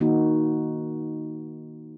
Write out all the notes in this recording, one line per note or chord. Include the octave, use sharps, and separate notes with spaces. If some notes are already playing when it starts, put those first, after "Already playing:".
D#3 A#3 D#4 F#4